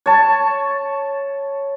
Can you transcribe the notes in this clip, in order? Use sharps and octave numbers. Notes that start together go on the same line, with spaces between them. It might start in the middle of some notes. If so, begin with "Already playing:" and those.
C#5 A5